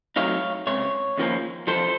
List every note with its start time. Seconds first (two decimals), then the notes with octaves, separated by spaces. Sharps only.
0.16 C2 C3 F#3 A3 D#4 C#5 F5
0.67 C#2 C3 C#5
1.18 D#2 C#3 F3 A#3 C#4
1.67 C3 F3 A4 C5
1.72 C2